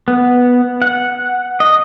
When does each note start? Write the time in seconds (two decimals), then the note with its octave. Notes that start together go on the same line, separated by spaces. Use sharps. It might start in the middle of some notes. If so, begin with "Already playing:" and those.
0.08 B3
0.82 F#5
1.60 D#5